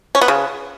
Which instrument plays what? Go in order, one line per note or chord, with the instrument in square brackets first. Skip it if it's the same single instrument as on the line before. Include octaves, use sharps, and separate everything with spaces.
[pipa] C#4
B3
C#3